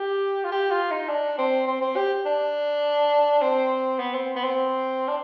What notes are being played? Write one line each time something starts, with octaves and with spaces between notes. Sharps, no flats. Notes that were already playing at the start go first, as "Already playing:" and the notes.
Already playing: G4
F4
G4
F4
D#4
D4
C4
C4
C4
G4
D4
C4
B3
C4
B3
C4
D4